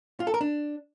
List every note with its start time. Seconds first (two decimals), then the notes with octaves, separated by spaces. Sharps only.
0.20 F4
0.27 A4
0.34 A#4
0.41 D4